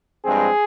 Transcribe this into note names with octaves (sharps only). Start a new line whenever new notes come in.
G2 F3 G#3 C4 G#4